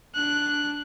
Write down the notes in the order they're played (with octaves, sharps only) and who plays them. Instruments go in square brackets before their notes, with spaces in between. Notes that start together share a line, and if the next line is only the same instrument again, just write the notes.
[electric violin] D4 F#6